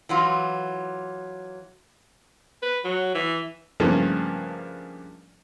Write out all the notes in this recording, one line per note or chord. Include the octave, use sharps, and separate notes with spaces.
E3 F#3 F4
B4
F#3
E3
G2 C#3 F3 A3 A#3